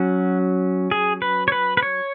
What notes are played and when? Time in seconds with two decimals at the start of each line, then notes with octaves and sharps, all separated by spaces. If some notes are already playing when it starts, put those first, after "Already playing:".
Already playing: F#3 C#4 F#4
0.91 G#4
1.22 B4
1.48 C#5
1.52 B4
1.77 B4
1.83 C#5